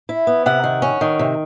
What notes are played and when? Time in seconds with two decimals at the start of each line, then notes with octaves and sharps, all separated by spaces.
0.09 E4
0.27 B3
0.46 C3 F#5
0.64 D#3
0.82 C#4
1.01 D#3
1.19 C3